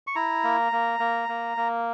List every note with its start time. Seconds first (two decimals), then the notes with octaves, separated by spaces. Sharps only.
0.07 C#6
0.16 E4 A#5
0.44 A#3
0.72 A#3
1.00 A#3
1.29 A#3
1.57 A#3